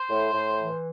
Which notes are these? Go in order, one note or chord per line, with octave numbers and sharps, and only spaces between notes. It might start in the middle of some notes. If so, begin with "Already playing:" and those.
Already playing: C5
A2
A2
E3